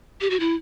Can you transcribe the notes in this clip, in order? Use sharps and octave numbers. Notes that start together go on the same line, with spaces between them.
G4
F#4
E4